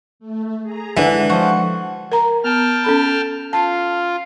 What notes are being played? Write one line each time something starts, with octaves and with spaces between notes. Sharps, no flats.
A3
G#4 A#5
D3 E3 G#3
F3 F#4 C5 D#5 C#7
A#4 A#5
B3 G5 A5 F6
C#4 A4 B5
F4 A5